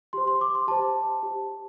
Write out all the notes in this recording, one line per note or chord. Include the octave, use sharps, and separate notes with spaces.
G4 C5 C6
C6
D6
C6
G4 C5 A5
G4 C5